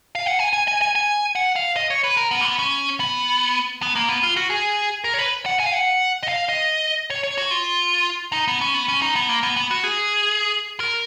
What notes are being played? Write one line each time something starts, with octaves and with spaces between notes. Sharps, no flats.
F5
F#5
G#5
G#5
G#5
G#5
G#5
F#5
F5
D#5
C#5
B4
A#4
B3
A#3
B3
C#4
B3
B3
A#3
B3
F4
F#4
G#4
A#4
C#5
B4
F#5
G#5
F5
F#5
D#5
F5
D#5
C#5
C#5
F#4
F4
D#4
B3
C#4
B3
C#4
D#4
B3
A#3
B3
B3
F#4
G#4
A#4